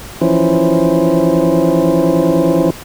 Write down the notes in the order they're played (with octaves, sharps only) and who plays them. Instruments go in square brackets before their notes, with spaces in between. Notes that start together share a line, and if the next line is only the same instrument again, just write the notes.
[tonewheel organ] E3 F3 C#4 E4 C5